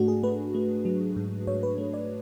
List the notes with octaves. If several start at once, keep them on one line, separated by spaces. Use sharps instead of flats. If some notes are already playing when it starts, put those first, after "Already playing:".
Already playing: G#2 A3 D4 F#4
G#4
A3 B4
A3
F#3
G#2
G#2 C#5
B4
A3
D5